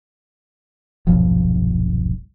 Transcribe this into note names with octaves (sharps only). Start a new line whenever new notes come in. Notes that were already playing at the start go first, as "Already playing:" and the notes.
D#1 B1 G2 F3